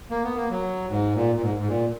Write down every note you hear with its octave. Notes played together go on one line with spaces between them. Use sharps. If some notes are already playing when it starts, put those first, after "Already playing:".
A#3
B3
A#3
F#3
G#2
A#2
A#2
G#2
G#2
A#2